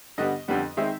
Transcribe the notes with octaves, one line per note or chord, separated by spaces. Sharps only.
G2 D3 G3 B3 D#5
F2 D3 G3 B3
D#3 G#3 C4 E5